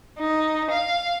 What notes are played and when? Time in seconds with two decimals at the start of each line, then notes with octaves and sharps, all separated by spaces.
0.19 D#4
0.71 F5